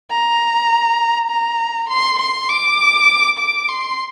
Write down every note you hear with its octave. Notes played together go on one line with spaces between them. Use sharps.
A#5
A#5
C6
C6
D6
D6
C6